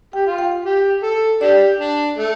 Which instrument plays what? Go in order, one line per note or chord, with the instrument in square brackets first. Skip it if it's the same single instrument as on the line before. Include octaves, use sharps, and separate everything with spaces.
[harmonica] G4 [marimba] G5
[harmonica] F4
[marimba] G5
[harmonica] G4
A4
[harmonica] D4 G4 [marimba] D5
[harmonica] D4
A3